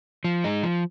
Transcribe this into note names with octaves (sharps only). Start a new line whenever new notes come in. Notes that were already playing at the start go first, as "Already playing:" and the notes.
F3
G#3 D#4
F3